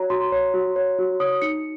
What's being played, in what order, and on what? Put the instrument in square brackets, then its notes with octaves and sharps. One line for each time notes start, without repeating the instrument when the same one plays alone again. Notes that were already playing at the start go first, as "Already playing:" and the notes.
Already playing: [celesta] F#4 C#5 A#5
F#4 C6
C#5
F#4
C#5
F#4
C#5 D#6
D#4 C#7